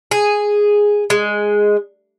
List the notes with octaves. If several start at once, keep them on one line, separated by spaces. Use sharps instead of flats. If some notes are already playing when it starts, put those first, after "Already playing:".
G#4
G#3